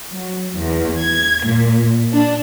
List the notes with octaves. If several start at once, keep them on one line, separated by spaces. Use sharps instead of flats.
F#3
E2
G#6
A#2
D4